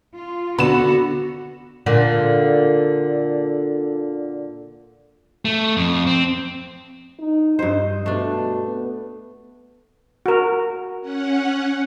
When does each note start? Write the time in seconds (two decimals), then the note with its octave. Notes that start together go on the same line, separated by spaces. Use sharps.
0.14 F4
0.59 D3 B3 F#4 B5 E7
1.86 A#2 D3
5.45 A3
5.77 F2
6.07 C4
7.19 D#4
7.59 G2 C5 D#5
8.06 B2 A3 D4
8.64 B3
10.26 F#4 A#4
11.01 C#4 F#5